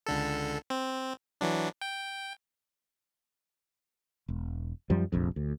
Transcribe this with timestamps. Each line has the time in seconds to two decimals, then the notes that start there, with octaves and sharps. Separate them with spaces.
0.07 C#2 D3 A4
0.70 C4
1.41 E3 F#3 D4
1.81 G5
4.28 E1
4.90 F#2 F3 G3
5.12 F1 A#1 F2
5.36 D2